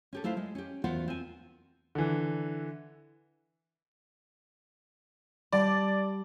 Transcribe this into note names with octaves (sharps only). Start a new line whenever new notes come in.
C#4 G4 A4
A3 E4 F4 C5 F5
G#3
C#4 G4
E2 B3 F4 F#4 C5 F#5
C4 G#5
D3 E3
G3 D5 A5 G6